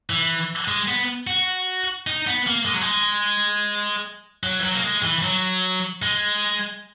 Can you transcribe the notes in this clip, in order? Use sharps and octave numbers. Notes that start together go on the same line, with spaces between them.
E3
G#3
B3
F#4
D#4
B3
A#3
G#3
F#3
G#3
F#3
E3
F#3
A#3
G#3
E3
F#3
G#3